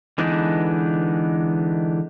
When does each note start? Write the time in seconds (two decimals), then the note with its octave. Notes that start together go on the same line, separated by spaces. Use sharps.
0.18 D3 E3 G#3 B3 D4 D#4